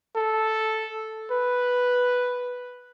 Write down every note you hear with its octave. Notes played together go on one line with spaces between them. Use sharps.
A4
B4